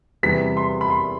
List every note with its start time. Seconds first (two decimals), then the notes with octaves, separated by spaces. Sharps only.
0.23 E2 C3 E3 G3 B3 B6
0.57 C6
0.81 B5
0.90 C6